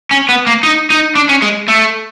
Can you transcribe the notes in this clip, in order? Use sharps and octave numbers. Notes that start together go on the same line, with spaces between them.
C#4
B3
A#3
D#4
D#4
D4
C#4
G#3
A3